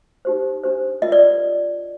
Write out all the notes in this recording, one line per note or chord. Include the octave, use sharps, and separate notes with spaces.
D#4 G4 C5
D4 G4 C5
F4 A#4 D#5
D5